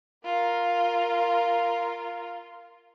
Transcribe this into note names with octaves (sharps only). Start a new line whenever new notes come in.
F4 A#4